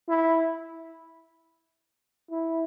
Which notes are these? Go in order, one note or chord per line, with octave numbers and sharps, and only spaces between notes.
E4
E4